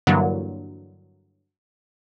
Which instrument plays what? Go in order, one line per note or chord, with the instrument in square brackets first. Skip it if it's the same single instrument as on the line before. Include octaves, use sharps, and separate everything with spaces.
[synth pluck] G2 D3 E3 F#3 A#3